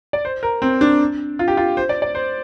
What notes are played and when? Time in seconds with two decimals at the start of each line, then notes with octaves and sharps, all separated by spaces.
0.13 D5
0.25 C5
0.43 A#4
0.62 C4
0.81 D4
1.39 F4
1.48 G4
1.57 F4
1.77 C5
1.89 D5
2.02 D5
2.15 C5